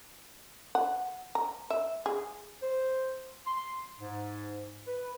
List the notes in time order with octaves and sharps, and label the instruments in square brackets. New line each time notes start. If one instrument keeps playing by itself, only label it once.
[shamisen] F#5
A#5
E5
G#4
[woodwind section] C5
C6
G#2
B4